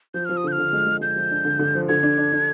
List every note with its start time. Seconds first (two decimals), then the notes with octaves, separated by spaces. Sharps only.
0.14 F3 G6
0.25 F3 F6
0.37 D#6
0.44 D3 G6
0.52 F6
0.58 D3
0.73 G#3
0.87 G#3
1.01 G#3 G6
1.16 F3
1.31 D4
1.45 D3
1.59 D3
1.75 F3
1.89 D3 G#6
2.03 D4
2.18 D4
2.32 D4